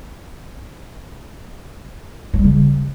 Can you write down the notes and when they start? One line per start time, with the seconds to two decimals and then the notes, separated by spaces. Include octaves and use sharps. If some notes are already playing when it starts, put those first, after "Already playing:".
2.34 F3
2.39 G3
2.44 C#3